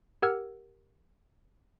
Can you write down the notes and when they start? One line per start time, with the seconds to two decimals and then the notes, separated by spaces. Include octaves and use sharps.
0.22 G4 A#4 F#5 E6 F6 G#6